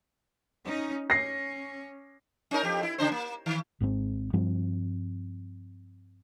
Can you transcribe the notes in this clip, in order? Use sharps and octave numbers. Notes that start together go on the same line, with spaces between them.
C#4 D#4
C#4 A#6 C7
C#4 D#4 A#4
F2 G4
E4
C#3 D4 C5
A#3
D#3
G#1 G#2 D3 C4
G2 F3 C4